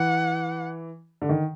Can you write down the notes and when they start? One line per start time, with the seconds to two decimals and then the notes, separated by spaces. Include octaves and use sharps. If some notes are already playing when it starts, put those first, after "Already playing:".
Already playing: E3 F#5
1.22 D3
1.29 D#3